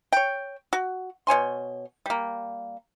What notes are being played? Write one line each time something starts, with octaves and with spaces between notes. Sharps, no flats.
C#5 G5
F#4
B2 C#5 G#5 C6
G3 A#3